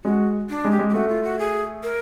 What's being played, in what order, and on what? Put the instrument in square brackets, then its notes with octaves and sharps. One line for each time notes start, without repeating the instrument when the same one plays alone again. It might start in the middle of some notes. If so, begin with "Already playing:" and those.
[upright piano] G#3 [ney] F#4
[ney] D4
[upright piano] G#3
[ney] G4
[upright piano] G#3
[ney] G4
[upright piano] A3 [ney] F#4
[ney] F4
F#4
G#4
A#4